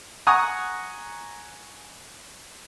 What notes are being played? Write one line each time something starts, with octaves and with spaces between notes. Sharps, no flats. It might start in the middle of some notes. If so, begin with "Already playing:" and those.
F#5 G#5 A#5 C#6 D#6